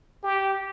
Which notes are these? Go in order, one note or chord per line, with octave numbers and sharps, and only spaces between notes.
G4